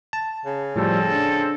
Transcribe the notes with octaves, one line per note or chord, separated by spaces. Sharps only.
A5
C#3
A2 F3 G3 C4 A4
D4